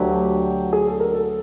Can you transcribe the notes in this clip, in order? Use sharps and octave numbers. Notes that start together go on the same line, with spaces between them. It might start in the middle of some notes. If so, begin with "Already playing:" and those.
Already playing: D2 D3 F#3 G4
G#4
A4
A#4
A4